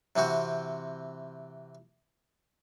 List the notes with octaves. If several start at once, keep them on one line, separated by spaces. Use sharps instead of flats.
C3 E3 C4 F#4